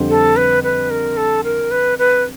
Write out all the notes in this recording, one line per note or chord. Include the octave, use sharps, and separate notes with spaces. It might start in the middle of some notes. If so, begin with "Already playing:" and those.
Already playing: F2 D3 G3 C4
A4
B4
B4
A#4
A4
A#4
B4
B4